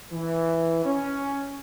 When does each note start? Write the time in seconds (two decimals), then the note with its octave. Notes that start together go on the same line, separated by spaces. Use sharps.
0.12 E3
0.86 C#4